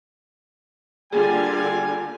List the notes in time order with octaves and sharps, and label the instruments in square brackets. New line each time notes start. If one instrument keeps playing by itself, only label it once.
[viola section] D3 A#3 F4 [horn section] G3 G#5 [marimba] G#4